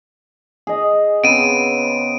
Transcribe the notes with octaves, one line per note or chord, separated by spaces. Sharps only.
G#4 D#5
C#3 B3 C4 D7 D#7